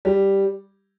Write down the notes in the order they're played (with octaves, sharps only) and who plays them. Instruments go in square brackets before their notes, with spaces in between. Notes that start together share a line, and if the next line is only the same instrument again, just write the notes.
[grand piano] G3